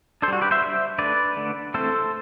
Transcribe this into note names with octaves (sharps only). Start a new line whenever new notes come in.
D4 A4 C5
G3 F#4
G4 B4
C5 E5
G3 D4
D3 A3 D4 B4 D5
D3 A3 D4
E3 A3 C4 A4 C5